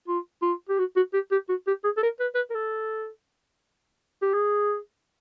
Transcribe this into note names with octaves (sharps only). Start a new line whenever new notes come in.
F4
F4
G4
F#4
F#4
G4
G4
F#4
G4
G#4
A4
A#4
B4
B4
A#4
A4
G4
G#4